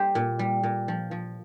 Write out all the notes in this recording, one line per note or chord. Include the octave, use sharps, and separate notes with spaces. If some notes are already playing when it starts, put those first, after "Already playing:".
Already playing: G3 G4 C5
A#2
G3
A#2
F3
F3